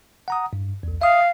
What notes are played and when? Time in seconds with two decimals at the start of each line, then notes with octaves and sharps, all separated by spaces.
0.28 F#5 A#5 D#6
0.53 G2
0.83 B1 E2
1.02 E5 F5 D#6